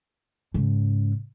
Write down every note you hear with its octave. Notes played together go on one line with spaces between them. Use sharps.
G#2 C#3